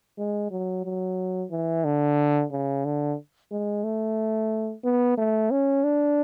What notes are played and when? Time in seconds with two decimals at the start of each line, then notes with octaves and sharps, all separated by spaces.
0.18 G#3
0.51 F#3
0.85 F#3
1.51 E3
1.85 D3
2.52 C#3
2.85 D3
3.52 G#3
3.84 A3
4.84 B3
5.18 A3
5.51 C#4
5.84 D4